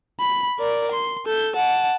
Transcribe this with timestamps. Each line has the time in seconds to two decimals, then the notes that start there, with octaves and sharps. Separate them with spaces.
0.20 B5
0.60 A#4 D5
0.92 C6
1.26 A4 G6
1.56 F#5 A5